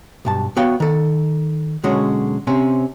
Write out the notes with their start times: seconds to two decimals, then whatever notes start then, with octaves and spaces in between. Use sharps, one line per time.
0.25 B1 G2 A5
0.56 B3 F#4 C#5 F5 G5
0.80 D#3 A4
1.83 B1 D3 G#3 C#4 F#4 C#5
2.47 C3 C4 C#4